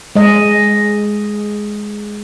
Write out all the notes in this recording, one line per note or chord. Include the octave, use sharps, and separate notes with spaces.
G#3 D#5